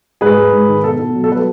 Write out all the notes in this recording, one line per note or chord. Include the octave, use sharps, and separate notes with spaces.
G#2 G#4 B4
G#3
G#2
D#3
B2 A4
B2
F#3
A4
F#3 B4